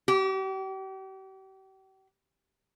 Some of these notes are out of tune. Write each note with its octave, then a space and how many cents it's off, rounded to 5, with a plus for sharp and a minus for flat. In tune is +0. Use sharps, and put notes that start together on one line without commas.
G4 -40